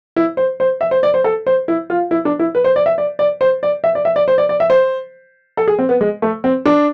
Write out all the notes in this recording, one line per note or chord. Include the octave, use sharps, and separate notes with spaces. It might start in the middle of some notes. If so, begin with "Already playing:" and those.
E4
C5
C5
E5
C5
D5
C5
A4
C5
E4
F4
E4
D4
E4
B4
C5
D5
E5
D5
D5
C5
D5
E5
D5
E5
D5
C5
D5
D5
E5
C5
A4
G#4
C4
B3
G#3
A3
C4
D4